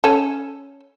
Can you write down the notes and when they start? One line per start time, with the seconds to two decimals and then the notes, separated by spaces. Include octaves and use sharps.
0.04 C#4 A4